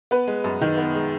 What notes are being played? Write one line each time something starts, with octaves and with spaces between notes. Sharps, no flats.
B3 B4
G#3
F#2
D#3
B3
G#3